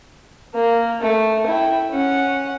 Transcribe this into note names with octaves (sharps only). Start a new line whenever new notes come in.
A#3
A3
E4 G5
C#4 F#5